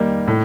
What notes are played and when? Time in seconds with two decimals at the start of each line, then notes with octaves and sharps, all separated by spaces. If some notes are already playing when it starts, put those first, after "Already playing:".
Already playing: D#3 G3 A#3 D#4
0.28 A2